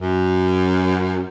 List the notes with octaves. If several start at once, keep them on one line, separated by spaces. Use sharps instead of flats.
F#2